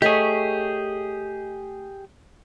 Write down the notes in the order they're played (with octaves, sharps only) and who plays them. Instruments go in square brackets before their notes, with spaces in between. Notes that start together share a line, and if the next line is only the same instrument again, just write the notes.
[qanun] A3 C#5 [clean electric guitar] G4 G#4 [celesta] D#5 B6